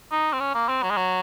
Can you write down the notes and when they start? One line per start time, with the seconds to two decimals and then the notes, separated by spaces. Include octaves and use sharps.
0.12 D#4
0.33 C4
0.40 C#4
0.54 A#3
0.69 C4
0.83 F#3
0.90 G#3
0.97 F#3